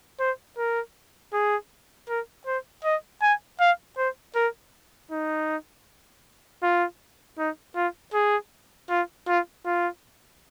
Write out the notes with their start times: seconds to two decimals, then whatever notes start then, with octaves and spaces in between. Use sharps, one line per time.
0.20 C5
0.58 A#4
1.33 G#4
2.09 A#4
2.47 C5
2.84 D#5
3.22 G#5
3.60 F5
3.98 C5
4.36 A#4
5.11 D#4
6.63 F4
7.38 D#4
7.76 F4
8.14 G#4
8.90 F4
9.28 F4
9.66 F4